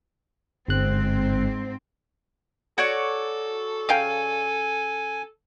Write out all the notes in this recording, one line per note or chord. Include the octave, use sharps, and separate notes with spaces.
G1 G#2 C4 F#6
F#4 A4 C#5 D5
C#3 F5 G5 G#5